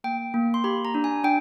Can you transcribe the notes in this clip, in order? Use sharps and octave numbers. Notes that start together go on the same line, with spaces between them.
A#3 G5
A#3
C6
G4 B5
A#5
D4
G#5
D4 G5